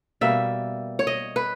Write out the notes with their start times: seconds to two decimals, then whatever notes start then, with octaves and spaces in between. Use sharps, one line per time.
0.21 B2 G3 A#3 E5
0.99 C#5
1.07 D#5
1.36 B4